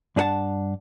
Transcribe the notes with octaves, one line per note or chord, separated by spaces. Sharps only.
G2 D4 D#4 A4 F#5 A5